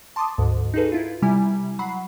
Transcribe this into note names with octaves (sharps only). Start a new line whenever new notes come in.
A5 C6 D6 D#6
D2 G#2
D#4 F#4 G#4 A4 B4
E4 F4
C3 G3 E4 G#5
F#3 F#5 B5 C7